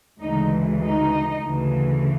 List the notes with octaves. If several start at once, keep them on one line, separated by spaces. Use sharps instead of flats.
D2 C#3 E3 G#3 D#4
D#4
D2 C#3 E3